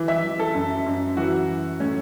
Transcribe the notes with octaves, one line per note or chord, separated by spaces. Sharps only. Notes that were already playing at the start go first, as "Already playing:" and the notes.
Already playing: E3
E5
E3
A4
F#2
F#2
E3 F#4
E3
A2 C#4